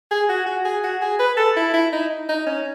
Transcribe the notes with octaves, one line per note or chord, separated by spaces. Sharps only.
G#4
F#4
F#4
G#4
F#4
G#4
B4
A4
E4
E4
D#4
D#4
C#4